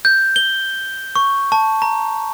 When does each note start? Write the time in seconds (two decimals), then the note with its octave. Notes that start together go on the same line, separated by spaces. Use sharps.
0.05 G6
0.36 G7
1.16 C#6
1.52 A5
1.82 A#5